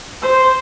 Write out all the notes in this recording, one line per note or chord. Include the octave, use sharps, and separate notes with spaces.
C5